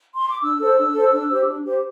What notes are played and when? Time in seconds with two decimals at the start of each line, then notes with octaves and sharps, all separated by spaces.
0.15 C6
0.29 D6
0.42 D4 E6
0.60 A4 C5
0.77 D4
0.94 A4 C5
1.12 D4
1.30 G4 C5
1.47 D4
1.64 G4 C5